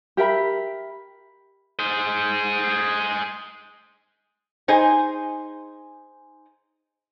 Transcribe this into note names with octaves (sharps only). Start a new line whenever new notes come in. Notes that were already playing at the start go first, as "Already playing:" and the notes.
G4 A#4 E5 B5
G#4 C5
D#4 G#4 C5 G#5